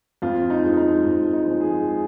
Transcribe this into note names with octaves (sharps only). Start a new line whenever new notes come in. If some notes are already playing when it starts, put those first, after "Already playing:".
F2 F4
D#4
F3 G#3
D#4
F2
D#4
F3 G#3
G#4
G#4